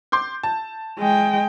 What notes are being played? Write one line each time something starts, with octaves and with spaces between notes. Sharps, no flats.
C6 D6 G6
A5
G#3 G5